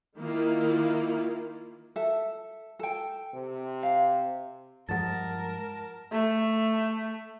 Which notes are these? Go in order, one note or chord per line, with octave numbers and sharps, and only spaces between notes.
D#3 A#3 E4 F4
A4 E5
A4 G5
C3
F5
G2 F3 G#3 A#4 F#5 A5 A6
A3